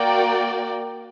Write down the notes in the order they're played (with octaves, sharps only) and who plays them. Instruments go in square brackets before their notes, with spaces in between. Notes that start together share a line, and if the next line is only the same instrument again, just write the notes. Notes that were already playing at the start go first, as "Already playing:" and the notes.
Already playing: [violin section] A#3 F#4 A#4 D5 G5